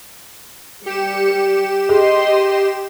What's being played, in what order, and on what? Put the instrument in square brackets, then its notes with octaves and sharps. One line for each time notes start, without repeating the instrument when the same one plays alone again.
[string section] G3 C#7 [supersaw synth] G4 E7
[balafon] G#4 [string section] D#5 C6